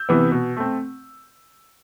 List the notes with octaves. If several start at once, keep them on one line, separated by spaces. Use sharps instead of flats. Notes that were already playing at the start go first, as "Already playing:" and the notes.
Already playing: E6 G6
C3 E3 B3
B2
A3 C4